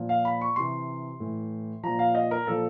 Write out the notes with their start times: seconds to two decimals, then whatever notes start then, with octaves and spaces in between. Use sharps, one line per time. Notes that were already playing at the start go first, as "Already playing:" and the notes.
Already playing: A#2 F3
0.09 F5
0.25 B5
0.41 C#6
0.56 C3 E3 C6
1.20 A2 E3
1.83 A#2 F3 A#5
1.99 F5
2.15 D#5
2.31 A#4
2.47 A#2 F3 A4